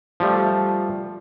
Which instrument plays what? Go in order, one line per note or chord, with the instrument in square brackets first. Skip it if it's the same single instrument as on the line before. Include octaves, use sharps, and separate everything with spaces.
[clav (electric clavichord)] F3 G3 A3